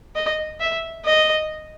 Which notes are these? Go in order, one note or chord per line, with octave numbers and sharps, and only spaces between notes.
D#5
E5
D#5